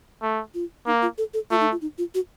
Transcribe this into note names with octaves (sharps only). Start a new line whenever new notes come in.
A3
F4
A#3 D#4
F4
A4
A4
A3 F4
D#4
F4
D#4
F4
F#4